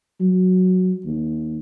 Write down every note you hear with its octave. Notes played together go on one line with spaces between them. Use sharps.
F#3
D#2